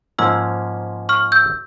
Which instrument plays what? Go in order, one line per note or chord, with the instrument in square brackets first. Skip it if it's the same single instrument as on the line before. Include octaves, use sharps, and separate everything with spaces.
[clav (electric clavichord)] G#2 F3 A#3 C#4 [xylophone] C6 E6
[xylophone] C#6 F6
E6 G6